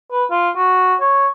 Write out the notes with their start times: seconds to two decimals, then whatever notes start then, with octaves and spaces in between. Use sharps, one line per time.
0.11 B4
0.31 F4
0.56 F#4
1.00 C#5